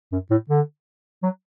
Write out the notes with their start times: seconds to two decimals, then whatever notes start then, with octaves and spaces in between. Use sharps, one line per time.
0.12 F#2
0.31 A2
0.49 D3
1.23 F#3